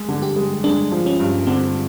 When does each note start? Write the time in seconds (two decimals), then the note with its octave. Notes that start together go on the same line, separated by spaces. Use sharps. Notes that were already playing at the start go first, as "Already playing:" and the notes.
Already playing: G#3
0.09 D3
0.22 G4
0.36 G#3
0.64 G#3 D4
0.92 F3
1.06 C#4
1.20 G2
1.47 D3 C4